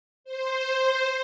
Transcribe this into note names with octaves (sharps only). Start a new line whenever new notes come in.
C5